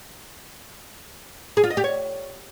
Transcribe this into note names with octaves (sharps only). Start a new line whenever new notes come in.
G#4
F4
D#5
G4
C#5